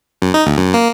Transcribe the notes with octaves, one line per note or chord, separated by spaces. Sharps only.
F#2
D#4
D2
F#2
A#3